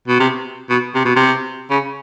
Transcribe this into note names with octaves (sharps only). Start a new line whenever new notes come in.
B2
C3
B2
C3
B2
C3
C#3